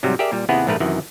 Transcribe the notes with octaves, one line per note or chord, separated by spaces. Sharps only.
G#2 C3 F#3 G3
G4 G#4 A#4 D5 E5
A#2 G3
D#2 C3 B3 E4 G#4 F#5
A#1 G#2 A3 A#4 B4
F#2 C3 D#3 E3